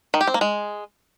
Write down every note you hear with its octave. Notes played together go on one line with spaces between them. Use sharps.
D#3
G4
C4
A#3
G#3